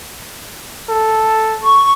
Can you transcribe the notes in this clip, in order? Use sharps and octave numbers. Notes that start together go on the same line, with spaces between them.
A4
C#6